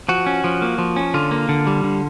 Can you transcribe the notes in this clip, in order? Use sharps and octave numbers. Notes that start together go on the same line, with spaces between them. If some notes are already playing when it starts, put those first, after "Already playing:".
F3 F#4
C#4
F3
A#3
F3
C#4
D3 F4
A#3
D3
G3
D3